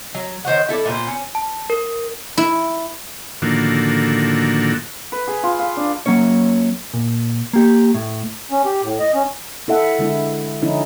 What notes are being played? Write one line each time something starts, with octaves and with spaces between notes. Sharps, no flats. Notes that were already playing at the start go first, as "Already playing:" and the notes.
F#3
D#3 C5 C#5 F#5
E4 A4 C5 D5
A#2 B3 A4 C5
C#4
A5
A#4
E4
A2 D3 D#3 F3 A#3 F#4
B4
G#4
F4
F5
D4
F#3 A#3 C#4 C#5
A#2
A#3 G4
A2
C#4
G4
A2
D#5
C#4
E4 A4 E5 F#5
D3 G#3 E4
D3 F3 C#4 D#4 E4